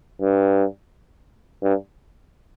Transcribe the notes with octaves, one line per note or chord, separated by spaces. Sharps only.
G2
G2